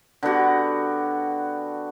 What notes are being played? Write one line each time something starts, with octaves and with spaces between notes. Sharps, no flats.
D3 B3 F#4 G4